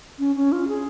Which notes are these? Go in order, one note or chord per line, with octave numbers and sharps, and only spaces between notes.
C#4
C#4
F4
G#4